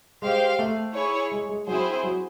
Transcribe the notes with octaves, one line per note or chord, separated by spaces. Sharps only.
G#3 G4 C5 F5
A3
E4 G#4 C#5
G#3
G#3
F#3 C4 E4 G#4 C5
F#3